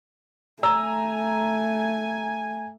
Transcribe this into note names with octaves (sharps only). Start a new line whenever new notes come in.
A3 G#5 A#5 E6